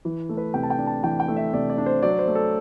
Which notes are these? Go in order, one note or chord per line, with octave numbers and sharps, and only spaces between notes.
E3
A3
B4
C3 G5
A5
G5
D4
A5
E3 G5
G5
A3
E5
C3 D5
D5
D4
C5
F#3 D5
C5
A3
A4